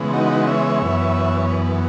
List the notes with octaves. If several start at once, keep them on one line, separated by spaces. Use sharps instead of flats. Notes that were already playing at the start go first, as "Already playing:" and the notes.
Already playing: C#3 E3 G#3 B3
D#4 F#4
C#5 E5
F#2 E3 B3